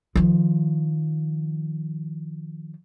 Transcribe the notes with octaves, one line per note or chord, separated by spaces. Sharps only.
D#3 F3